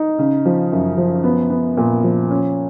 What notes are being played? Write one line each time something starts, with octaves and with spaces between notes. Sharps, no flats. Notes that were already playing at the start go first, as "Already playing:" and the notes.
Already playing: D#4
C#3
F3
F#2
F3
B3
B3
A#2
F3
C#4